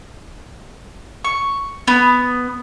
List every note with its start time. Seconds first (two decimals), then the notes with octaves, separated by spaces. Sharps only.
1.25 C#6
1.87 B3